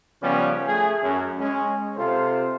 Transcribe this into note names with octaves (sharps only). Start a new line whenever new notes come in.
C#3 F3 G3 B3 C#4
A3 G#4
F#2
G#3 C#4
C3 F4 A4 C5